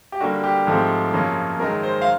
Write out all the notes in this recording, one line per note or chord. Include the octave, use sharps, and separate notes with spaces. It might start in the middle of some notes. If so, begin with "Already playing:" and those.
G4
D3 G3 A#3 F#4
G4
G#2 F3 A3 C4
F#2 C#3 F3 A#3 C#4
F#2 D#3 G#3 A#4
C5
F5